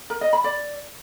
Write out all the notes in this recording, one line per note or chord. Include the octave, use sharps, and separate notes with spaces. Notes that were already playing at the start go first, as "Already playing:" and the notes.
A#4
D#5
B5
D5